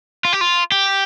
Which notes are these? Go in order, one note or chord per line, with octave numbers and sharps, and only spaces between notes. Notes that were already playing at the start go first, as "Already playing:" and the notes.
F4
G4
F4
G4